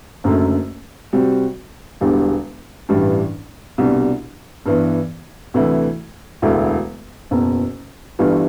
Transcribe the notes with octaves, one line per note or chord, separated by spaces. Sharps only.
F#1 F#2 D3 A3
C3 G3 C4 F#4
E1 E2 D3 G3 D4
A1 G2 E3 G3 D4
C2 B2 G3 D4
G2 E3 B3
D2 C3 E3 A3 E4
E1 D2 D3 A3 E4
F#1 E2 B2
G1 G2 E3 G3